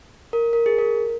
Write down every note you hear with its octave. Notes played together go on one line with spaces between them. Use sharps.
A#4
A#4
G#4
A#4